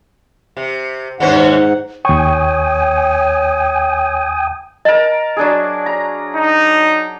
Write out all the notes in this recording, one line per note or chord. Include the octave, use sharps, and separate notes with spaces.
C3
D#2 G#2 C#4 C5 F#5
D#2 C#5 G5 G#5 C#6 D#6
A#4 D#5 A5
F#3 D4 G#4
A#5
D#4